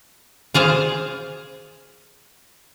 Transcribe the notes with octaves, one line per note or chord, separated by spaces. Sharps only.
F4 G#4 C5 F5